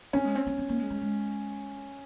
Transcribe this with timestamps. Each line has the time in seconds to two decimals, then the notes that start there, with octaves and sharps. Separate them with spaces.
0.13 C4 C#4
0.25 G#3
0.35 C4
0.47 C4
0.58 C4
0.69 A#3
0.79 G#3
0.90 G#3
1.01 G#3